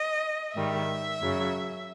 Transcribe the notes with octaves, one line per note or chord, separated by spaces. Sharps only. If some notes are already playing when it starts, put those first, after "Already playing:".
Already playing: D#5
G#2 D#3 G3 E5
F#2 C#3 F#3